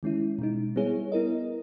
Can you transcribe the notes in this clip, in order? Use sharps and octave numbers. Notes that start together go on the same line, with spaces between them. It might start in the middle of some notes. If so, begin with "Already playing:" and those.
D#3 G#3 C#4 E4
B2 G#3 D#4
G3 B3 E4 G#4 C#5
B3 E4 A#4 D#5